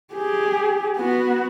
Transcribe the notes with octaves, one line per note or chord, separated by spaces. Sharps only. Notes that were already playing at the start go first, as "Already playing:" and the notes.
G4 G#4
B3 F#4